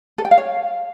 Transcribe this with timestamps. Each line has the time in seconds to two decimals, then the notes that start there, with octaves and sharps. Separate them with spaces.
0.18 A4
0.25 G5
0.31 F5
0.38 C#5